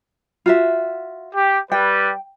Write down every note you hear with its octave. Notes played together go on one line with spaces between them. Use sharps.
F4 F#4 E5
G4
G3 B4 G5